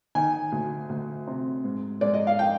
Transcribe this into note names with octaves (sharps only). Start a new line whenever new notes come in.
D#3 G#5
D2
D2
C3
G#2
G#2 D5
D#5
F5
G5